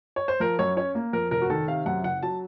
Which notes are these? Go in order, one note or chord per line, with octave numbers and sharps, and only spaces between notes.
C#5
C5
F3 A#4
F#2 C#5
C#4 C#5
A#3
F2 A#4
F1 A#4
F#4
D#3 A4
C3 F5
F#2 F#5
F#1 F#5
F#3 A5